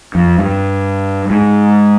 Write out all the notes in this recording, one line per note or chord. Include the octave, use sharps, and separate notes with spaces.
F2
G2
G#2